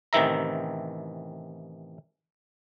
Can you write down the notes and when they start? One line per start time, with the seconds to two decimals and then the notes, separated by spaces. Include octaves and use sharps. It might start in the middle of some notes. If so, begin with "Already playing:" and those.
0.13 A1 C3 D#3 E3 E5 A#5